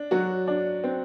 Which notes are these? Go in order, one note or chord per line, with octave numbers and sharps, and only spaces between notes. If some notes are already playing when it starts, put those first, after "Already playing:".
Already playing: D4
F#3 F#4
D4
C4